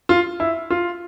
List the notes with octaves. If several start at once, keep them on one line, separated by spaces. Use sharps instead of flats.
F4
E4
F4